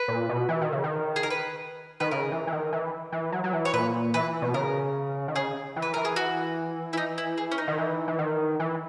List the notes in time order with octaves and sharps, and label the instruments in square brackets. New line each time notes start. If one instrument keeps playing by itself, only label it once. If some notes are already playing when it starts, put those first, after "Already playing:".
Already playing: [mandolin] B4
[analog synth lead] A#2
B2
E3
D#3
C#3
D#3
[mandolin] G#4
A#4
B4
[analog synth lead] D#3 [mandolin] B4
[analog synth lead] C#3 [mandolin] A#4
[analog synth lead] E3
E3
D#3
E3
E3
F#3
F#3
E3
[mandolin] C#5
[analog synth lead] A#2 [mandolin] B4
[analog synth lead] E3 [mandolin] B4
[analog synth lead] B2
[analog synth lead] C#3 [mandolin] A#4
[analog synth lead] D#3
[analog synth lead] C#3 [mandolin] G#4
[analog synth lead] E3
[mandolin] B4
[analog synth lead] E3 [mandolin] A#4
[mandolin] G#4
F#4
E4
D#4
E4
G#4
C#4
D#4
[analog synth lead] D#3
E3
E3
D#3
E3